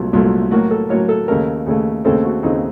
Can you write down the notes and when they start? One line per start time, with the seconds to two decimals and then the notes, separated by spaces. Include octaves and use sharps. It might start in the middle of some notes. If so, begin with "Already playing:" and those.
Already playing: C2 A#2 F#3 A3
0.13 C2 A#2 F#3 A3
0.51 A2 F#3 A#3 F#4
0.71 A4
0.89 A2 F#3 A#3 C#5
1.09 A4
1.28 D#2 C#3 A3 A#4
1.66 D#2 C#3 A3
2.04 D#2 C#3 A3 C4 A4
2.24 F#4
2.43 D#2 C#3 A3 C4 D#4